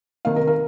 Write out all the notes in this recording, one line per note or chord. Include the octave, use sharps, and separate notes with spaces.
C3 D#3 A#3 F5
A#4
A#4